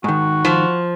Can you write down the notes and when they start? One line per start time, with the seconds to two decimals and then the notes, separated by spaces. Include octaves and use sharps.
0.04 G#2 D#3 F#4
0.45 F3